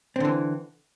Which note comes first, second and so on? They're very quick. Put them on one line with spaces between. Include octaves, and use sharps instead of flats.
C4 D3 E3